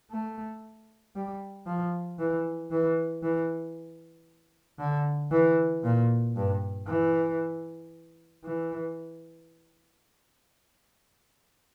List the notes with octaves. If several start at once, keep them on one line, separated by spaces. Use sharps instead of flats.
A3
G3
F3
E3
E3
E3
D3
E3
A#2
G2
E3
E3